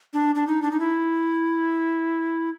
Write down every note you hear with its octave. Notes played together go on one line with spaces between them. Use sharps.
D4
D4
D#4
D4
D#4
E4